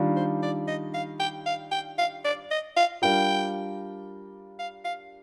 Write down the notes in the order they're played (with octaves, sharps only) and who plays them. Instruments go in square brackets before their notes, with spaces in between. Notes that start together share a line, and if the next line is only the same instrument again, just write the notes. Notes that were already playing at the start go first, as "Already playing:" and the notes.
Already playing: [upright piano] D#3 G3 D4 F4
[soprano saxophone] C5
D5
D#5
F5
G5
F5
G5
F5
D5
D#5
F5
[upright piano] G3 D4 F4 A#4 [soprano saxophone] G5
[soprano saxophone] F5
F5